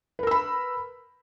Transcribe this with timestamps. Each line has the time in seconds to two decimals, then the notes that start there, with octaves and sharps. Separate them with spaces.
0.19 B4
0.23 A#4
0.27 E6
0.31 B5